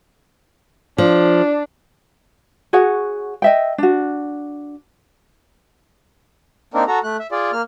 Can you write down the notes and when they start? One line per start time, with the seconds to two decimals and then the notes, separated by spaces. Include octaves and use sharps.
0.98 F3 D4
2.73 F#4 G#4 C#5 F#5
3.42 D#5 E5 G5
3.78 D4 F#4
6.74 A#3 C4 D4 D#4 A#4
6.88 F#4 A4 A#5
7.04 A3 F#6
7.20 E5
7.32 F4 G#4 D5
7.53 A#3 F6